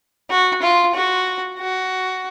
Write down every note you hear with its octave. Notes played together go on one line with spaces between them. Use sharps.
F#4
F4
F#4
F#4